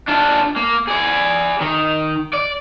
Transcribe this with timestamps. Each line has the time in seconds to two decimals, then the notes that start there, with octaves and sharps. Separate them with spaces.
0.08 D4 F4
0.57 A#3
0.88 G#4 D5
1.61 D#3
2.33 D5